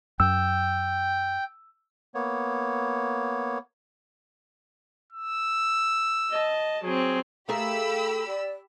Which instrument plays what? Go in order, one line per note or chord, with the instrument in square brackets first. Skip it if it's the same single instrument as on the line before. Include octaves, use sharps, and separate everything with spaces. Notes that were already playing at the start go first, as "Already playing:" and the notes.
[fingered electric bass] F#2 [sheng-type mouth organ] G5 [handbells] E6
[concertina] A#3 B3 C#5
[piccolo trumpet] E6
[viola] D#5 A5
[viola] F#3 C4 [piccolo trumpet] G#4
[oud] A3 G#4 A#4 [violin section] G4 B5 E6 [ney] F5
[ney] D5